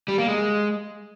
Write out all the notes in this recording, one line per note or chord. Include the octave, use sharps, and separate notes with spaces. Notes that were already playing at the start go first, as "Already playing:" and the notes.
G3
A#3
G#3